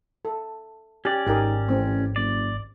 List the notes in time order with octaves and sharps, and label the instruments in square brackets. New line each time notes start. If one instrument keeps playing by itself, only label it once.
[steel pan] A4
[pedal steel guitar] C#4 D5 [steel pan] G4
[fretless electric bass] G#1 [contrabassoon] G#2 [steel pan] G4 G#4 A#4
[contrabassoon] A1 [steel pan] C4
[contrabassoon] F#1 [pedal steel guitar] D5